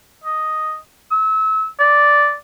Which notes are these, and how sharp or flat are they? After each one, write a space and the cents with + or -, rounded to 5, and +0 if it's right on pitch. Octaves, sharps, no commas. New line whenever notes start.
D#5 +0
E6 -30
D5 -5